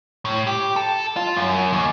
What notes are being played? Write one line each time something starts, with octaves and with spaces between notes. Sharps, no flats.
A2
G4
A4
F4
F#2
D#2